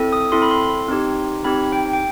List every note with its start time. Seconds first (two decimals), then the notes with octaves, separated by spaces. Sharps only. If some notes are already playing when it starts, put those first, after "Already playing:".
Already playing: C4 E4 A4
0.12 D#6
0.32 C4 E4 A4 C6
0.42 B5
0.51 C6
0.88 C4 D#4 G4
1.44 C4 D#4 G4 B5
1.72 G5
1.93 G5